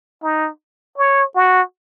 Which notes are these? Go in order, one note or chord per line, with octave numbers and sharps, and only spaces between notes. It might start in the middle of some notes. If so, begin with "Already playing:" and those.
D#4
C#5
F#4